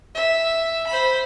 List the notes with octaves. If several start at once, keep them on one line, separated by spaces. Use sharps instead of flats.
E5
C5 B5